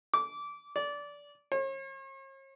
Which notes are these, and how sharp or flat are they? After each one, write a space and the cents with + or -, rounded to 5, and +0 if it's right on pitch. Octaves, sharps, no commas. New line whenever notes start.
D6 -20
D5 -20
C#5 -45